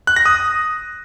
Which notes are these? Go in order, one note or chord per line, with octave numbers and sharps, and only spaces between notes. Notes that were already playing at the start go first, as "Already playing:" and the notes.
F#6
A#6
D#6